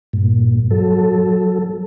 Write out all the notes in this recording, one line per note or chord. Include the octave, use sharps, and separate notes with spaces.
G2 A#2
F#3 A4